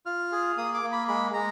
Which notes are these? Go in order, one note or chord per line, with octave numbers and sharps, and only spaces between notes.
F4 F6
G#4
A#3 D#6
D6
A#3
B5
G#3 B5
G#3 A#5